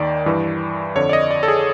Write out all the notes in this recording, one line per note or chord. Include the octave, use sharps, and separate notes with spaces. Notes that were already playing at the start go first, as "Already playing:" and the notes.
Already playing: D#2 D#3 D5
G2 E3
F2 D3 C#5
D5
D#5
D5
A4
G#4